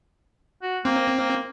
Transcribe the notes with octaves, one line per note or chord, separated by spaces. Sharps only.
F#4
A#3 C4
A#3